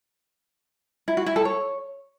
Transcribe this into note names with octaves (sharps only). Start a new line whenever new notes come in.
E4
F#4
E4
A4
C#5